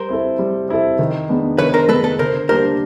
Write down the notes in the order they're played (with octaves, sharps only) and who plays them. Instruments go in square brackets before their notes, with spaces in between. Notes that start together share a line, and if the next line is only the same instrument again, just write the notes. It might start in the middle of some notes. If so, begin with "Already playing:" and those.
Already playing: [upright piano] G3 [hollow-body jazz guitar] A#4 C5
[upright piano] C4 E4 A4
G3
C4 E4 A4
D#3
G#3 B3 D4
[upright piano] D#3 [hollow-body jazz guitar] B4 C#5
[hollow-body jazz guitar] A#4 C5
[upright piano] G#3 B3 D4 [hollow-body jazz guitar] A4 B4
[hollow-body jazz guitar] A4 B4
[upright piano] D3 [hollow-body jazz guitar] A#4 C5
[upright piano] G3 A#3 D4 G4 [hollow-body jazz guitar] A#4 C5